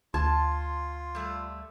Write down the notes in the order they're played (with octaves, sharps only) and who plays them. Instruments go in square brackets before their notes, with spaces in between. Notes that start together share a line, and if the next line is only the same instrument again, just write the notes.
[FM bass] D2 [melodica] F4 [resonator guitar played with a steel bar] A5 [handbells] C6 G#6
[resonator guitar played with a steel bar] G3 A3